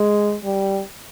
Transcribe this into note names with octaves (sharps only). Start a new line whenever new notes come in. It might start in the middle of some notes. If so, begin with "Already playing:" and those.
Already playing: G#3
G3